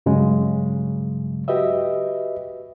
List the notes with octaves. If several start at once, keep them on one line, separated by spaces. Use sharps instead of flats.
G2 C#3 F#3 G#3
F#4 G4 B4 D#5 E5